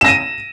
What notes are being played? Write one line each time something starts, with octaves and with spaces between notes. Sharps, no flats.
A#6 D#7 E7